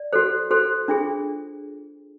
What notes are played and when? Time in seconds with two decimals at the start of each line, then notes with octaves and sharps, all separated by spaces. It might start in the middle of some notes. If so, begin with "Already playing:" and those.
Already playing: D5
0.13 F#4 A4 C5
0.51 F#4 A4 C5
0.88 D4 F4 G#4